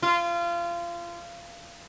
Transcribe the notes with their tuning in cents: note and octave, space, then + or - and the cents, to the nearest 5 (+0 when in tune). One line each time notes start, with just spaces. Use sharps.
F4 -25